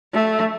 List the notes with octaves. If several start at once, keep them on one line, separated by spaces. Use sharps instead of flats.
A3